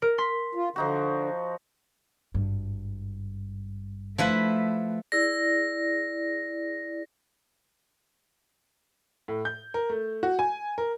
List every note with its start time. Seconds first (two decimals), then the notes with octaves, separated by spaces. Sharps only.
0.02 A#4
0.18 C6 B6
0.55 F4
0.76 D3 F3 D#4 F#4
2.34 G#1 G2
4.18 F3 A3 E4 B4
5.12 E4 G#4 D5 A#6
9.28 A2
9.45 G6
9.74 A#4
9.90 A3
10.23 F#4
10.39 G#5
10.78 A#4